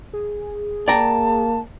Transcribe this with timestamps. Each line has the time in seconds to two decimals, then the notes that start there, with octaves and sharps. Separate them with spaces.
0.13 G#4
0.88 A#3 D5 G5 A5 A#5